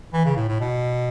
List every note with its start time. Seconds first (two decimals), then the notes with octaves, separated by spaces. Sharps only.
0.13 E3
0.25 C#3
0.36 A2
0.49 A2
0.60 B2